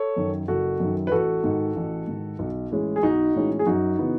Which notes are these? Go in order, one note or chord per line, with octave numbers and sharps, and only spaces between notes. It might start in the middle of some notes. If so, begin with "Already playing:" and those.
Already playing: A4 C#5
F#2 D#3
F#1 F#4 A4
F#2 D#3
B4
A1 F#4 A4
G#2 D#3
A1
G#2 D#3
B1
A2 E3 G#3 C#4
G#4
B1 D#4 F#4
A2 E3 G#3 C#4
G#4
F#2 D#4 F#4
C#3 E3 B3